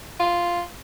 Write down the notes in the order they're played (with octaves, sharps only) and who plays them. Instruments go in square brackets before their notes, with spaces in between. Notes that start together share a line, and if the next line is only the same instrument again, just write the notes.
[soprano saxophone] F4